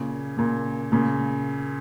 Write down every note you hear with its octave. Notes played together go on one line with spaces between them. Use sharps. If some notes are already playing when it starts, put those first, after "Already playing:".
Already playing: A#2 C#3
A#2 C#3
A#2 C#3